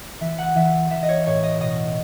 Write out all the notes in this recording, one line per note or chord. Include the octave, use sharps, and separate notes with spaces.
E3 E5
F#5
E3 E5
E3 E5
D#5
C#5
A2 C#5
D#5
B2 D#5